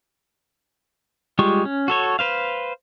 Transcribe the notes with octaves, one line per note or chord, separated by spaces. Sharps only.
G3 G#3 F4 G4 C#6
C#4
F#4 A4 C#5
B4 C5 F5